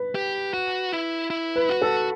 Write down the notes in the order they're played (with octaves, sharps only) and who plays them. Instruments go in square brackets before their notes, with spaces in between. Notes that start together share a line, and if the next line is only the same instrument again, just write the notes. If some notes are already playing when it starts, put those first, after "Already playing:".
Already playing: [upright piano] B4
[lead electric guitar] G4
F#4
E4
E4
[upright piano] B4
[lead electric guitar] F#4
[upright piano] A4